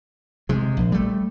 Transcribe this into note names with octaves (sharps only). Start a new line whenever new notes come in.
C3 G#3
A#1
G3 A3